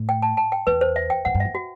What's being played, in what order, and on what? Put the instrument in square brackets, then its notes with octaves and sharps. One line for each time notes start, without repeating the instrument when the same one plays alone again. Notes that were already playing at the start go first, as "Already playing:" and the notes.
Already playing: [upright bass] A2
[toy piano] G5
A5
A5
G5
[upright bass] E2 [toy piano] B4
[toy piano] C5
E5
G5
[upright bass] A2 [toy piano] F#5
[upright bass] G2
[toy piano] E5
[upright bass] F#2
[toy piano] F#4